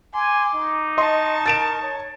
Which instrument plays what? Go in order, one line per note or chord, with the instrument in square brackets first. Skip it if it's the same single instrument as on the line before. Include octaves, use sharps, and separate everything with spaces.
[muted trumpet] G#5 [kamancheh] C6 [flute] D6
[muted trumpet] D#4
[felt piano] D#5 C6 [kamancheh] A5 C#6
[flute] A#4 [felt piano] A6 D7 E7
[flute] C#5